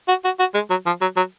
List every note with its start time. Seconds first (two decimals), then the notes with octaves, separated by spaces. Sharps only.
0.08 F#4
0.24 F#4
0.39 F#4
0.54 G#3
0.70 F#3
0.86 F3
1.01 F#3
1.16 F#3